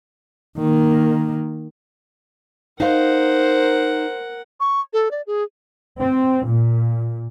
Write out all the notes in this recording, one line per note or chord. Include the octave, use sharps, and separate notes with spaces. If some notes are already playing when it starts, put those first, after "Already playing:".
D#3 A#3
D#4 A#4 C5 F5 F#5
C#6
A4
D5
G#4
C4
A#2